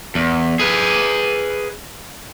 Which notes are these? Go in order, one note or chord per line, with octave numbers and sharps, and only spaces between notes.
E2
G#4 B4